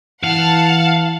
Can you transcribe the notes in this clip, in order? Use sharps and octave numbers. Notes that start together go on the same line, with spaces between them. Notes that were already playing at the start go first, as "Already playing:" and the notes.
E3 F5 F#5 A5